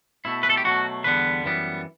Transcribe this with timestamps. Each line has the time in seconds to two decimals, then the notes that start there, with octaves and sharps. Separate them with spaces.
0.25 B2 A3 E4
0.43 B4
0.50 A4
0.57 G4
0.64 B2 F#3 A3 F#4
1.04 E2 D3 G3 B3 B4
1.45 F#2 E3 G3 B3